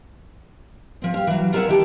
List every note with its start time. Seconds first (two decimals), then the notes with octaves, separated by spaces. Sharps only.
1.02 F3 C4
1.14 G4 F5
1.27 E3 F#3
1.53 F4 G#4 A#4 B4 E5 F#5
1.68 D#3 E3 G4 A5